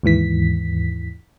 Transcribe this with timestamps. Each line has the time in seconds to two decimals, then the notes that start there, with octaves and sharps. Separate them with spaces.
0.03 D#2 G#2 E3 B6